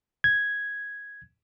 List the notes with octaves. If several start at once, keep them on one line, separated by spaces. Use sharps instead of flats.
G#6